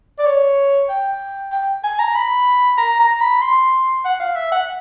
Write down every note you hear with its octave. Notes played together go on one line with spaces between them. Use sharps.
D5
C#5
G5
G5
G#5
A#5
B5
A#5
A#5
B5
C6
F#5
F5
E5
F#5